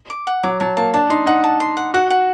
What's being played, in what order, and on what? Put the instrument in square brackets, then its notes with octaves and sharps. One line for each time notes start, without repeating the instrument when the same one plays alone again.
[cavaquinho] D6
F#5
[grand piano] F#3 [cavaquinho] D6
[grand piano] F#3 [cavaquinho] A5
[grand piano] A#3 [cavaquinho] A5
[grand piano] D4 [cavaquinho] A5
[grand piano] D#4 [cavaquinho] C6
[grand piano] D#4 [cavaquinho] F#5
[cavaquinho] A5
C6
F#5
[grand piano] F#4 [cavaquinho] F#5
[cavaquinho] F#5